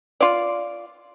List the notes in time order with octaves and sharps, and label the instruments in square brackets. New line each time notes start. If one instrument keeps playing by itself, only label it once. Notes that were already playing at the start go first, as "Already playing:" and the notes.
[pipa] F4 D5